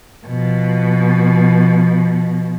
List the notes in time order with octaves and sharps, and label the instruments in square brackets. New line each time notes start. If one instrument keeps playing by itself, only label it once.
[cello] B2 F3